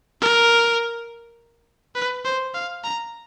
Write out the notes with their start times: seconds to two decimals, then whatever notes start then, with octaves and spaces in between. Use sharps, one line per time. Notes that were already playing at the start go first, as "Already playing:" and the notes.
0.21 A#4
1.95 B4
2.25 C5
2.54 F5
2.84 A#5